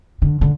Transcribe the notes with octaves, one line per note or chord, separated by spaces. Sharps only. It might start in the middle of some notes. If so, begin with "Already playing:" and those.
D3
D3